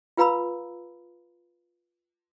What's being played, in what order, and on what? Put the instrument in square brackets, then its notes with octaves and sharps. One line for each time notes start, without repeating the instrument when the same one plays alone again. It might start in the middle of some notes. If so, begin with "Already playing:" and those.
[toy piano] F4 B4 F5 A#5 B5 E6